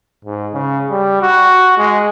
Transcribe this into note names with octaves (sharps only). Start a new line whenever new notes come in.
G#2
C#3
G3
F#4
G#3